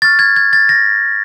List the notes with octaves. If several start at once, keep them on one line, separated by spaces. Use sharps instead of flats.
C#6 F6 A6
G#6
G#6
A6
A#6